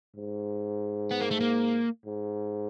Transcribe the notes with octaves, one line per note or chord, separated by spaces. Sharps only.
G#2
B3
A#3
A3
A#3
G#2